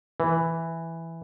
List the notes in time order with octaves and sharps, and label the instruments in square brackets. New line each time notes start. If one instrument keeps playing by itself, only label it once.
[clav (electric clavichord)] E3